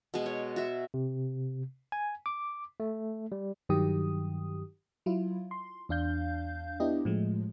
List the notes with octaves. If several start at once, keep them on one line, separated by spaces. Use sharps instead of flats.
B2 G#3
C#5
F#4 E5
C3
G#5
D6
A3
G3
G2 D#3 F#3 G4 D#6
F#3 E4 F4
C6
E2 D4 F5 G6
B3 D4 E4 G4 D#5
A2 F3 G#3